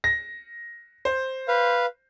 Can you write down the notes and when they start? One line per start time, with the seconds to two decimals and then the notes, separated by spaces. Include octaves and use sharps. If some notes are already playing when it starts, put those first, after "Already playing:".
0.04 A#6
1.05 C5
1.48 B4 F5